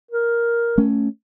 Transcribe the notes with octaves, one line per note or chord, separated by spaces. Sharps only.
A#4
A3 C#4